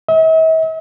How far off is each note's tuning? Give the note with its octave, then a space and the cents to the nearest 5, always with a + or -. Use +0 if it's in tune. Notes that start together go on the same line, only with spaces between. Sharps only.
E5 -45